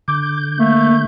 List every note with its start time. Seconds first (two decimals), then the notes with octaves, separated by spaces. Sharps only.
0.08 D3 D6 G6
0.59 A3 A#3